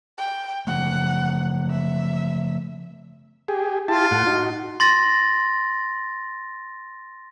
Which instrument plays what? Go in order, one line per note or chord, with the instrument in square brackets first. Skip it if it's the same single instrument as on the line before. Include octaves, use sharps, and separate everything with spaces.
[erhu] G5
[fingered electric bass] C#3 F3 A3 [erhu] F#5
[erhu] E5
[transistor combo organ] G4 G#4
[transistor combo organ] E4 G4 A5 [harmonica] F4
[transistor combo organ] A2 F#5
D#4 F#4
[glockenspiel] C6 A6 A#6